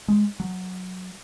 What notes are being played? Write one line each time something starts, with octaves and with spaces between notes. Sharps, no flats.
G#3
F#3